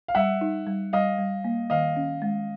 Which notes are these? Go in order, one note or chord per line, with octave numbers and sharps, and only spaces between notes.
F5
G3 E5 F#5
D#4
G3
G3 D#5 F5
G3
A#3
D#3 D#5 F5
C#4
G#3